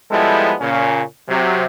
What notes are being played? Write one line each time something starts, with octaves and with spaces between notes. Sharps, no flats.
F3 G3 G#3 B3 E4 A4
A#2 C#3 C#4
C3 F#3